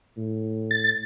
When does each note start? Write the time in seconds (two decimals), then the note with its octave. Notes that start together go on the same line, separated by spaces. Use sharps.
0.17 A2
0.71 A6